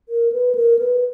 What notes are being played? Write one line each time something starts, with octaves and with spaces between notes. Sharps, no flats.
A#4
B4
A#4
B4